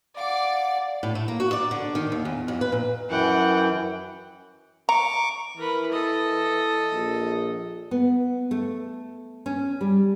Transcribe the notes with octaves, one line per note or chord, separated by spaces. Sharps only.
D5 F5 F#5 D6
A2
A3
A#3
F#4
D5
D3
D#3
D#2
E2
F2
B4
A#2
F#2 E3 F#5 G5
A#5 C#6 D6
E3 A#4 B4
A4 D#5
A#1
B3
A3
C#4
G3